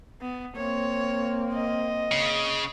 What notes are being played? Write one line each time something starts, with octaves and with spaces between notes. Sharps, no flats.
B3
A#3 C4 C#5
D#5
C#3